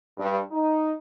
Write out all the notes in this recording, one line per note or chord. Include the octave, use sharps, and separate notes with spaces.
G2
D#4